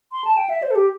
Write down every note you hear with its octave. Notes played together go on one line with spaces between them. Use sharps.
C6
A5
G5
E5
C5
A4
G4